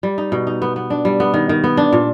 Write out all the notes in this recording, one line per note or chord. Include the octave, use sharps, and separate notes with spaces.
G3
D#4
B2
D#4
B3
B3
D4
G3
B3
D#3
D#3
B3
D4
A#2